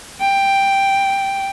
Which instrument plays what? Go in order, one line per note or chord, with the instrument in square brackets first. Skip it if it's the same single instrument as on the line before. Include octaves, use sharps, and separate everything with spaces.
[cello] G5